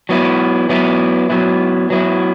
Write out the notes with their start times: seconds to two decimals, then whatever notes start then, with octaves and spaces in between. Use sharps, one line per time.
0.09 F#3 B3 E4
0.69 F#3 B3 E4
1.30 F#3 B3 E4
1.90 F#3 B3 E4